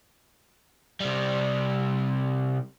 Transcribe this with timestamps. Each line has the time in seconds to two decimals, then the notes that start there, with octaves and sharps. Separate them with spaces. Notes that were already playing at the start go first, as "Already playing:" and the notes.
1.00 C3 G3